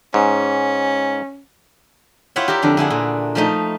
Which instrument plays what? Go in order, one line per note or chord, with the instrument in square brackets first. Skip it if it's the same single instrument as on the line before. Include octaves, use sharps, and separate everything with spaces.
[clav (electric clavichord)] G#2 [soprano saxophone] C#4
[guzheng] E4 F4 G4 C#5 E5 F#5
G4 A#4 D5 E5
F2 D3 D4
D3 E4 G#4 F#5
A#2 D3
F3 A3 D#4